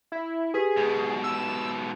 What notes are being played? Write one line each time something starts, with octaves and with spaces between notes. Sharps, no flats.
E4
G4 G#4 B4 B6
G#2 B2
E6